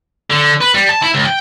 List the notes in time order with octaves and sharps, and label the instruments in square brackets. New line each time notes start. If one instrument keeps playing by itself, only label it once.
[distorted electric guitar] D3
B4
G3
A5
E4
C#2
G5